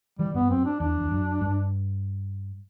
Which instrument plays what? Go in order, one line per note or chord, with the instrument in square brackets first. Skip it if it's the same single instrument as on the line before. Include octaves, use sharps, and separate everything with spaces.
[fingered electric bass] E3 [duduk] G3
[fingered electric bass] G2 [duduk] B3
[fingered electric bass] F#2 [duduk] C4
[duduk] D4
[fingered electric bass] E2 [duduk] D4
[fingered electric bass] E2
F#2
G2